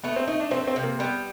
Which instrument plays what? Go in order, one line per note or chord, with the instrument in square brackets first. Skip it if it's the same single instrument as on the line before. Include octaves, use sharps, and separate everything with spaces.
[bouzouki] A3 [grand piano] B3
[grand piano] C4
[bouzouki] A3 [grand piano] D#4
[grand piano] D4
[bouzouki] F3 [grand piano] C4
[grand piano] C4
[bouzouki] C3
[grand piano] A#3
[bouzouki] G3 [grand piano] B3